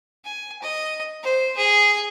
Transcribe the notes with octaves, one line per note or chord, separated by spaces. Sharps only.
G#5
D#5
C5
G#4